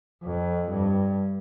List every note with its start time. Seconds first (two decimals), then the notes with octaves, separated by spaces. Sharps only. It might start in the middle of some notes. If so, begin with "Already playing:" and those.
0.23 F2
0.70 G2